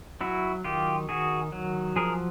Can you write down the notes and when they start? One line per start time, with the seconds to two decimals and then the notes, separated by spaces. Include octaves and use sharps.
0.21 F#3 E4 F#4
0.64 D#3 F4 G4
1.09 D#3 F#4 G#4
1.52 F#3
1.96 F3 G#4 A#4